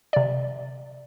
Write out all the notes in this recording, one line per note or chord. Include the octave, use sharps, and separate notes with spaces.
C3 D5